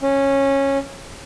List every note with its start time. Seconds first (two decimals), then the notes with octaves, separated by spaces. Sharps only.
0.02 C#4